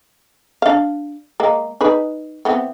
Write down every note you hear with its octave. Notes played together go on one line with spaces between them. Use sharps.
D4 F5
G#3 A#3
D#4 G#4 B4
E3 B3 C4